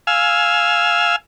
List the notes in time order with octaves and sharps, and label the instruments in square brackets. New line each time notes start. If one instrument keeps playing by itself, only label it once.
[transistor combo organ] F5 G#5 E6